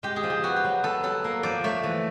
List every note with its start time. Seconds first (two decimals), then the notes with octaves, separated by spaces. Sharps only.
0.03 G#3 G4
0.16 G#4
0.23 F3
0.30 G4
0.43 B3 F#4
0.56 G4
0.64 F#3
0.83 B3 A4
1.03 F#3 A4
1.24 A#3
1.43 F3 D5
1.64 A3 C#5
1.83 E3